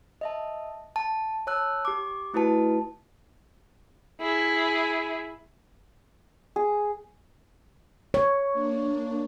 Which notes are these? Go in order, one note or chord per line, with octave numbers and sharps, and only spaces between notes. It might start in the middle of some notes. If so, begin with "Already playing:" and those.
D#5 E5 A5
A5
C#5 A5 E6 F#6
G4 D6
A3 E4 F#4 B4 A5
E4 G#4
G#4
C#5
A#3 D4